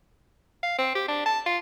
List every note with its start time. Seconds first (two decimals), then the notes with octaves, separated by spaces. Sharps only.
0.63 F5
0.78 C4
0.95 G4
1.08 D4
1.26 A5
1.46 F4